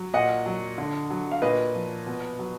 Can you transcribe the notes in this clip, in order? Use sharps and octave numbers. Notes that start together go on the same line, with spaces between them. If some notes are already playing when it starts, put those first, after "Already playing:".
Already playing: F#3
A#2 D#5 F#5
F#3
D3
F#3
F5
A#2 B4 D#5
F3
B2
F#3